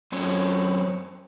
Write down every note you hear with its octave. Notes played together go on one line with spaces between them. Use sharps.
F#2 C4 C#4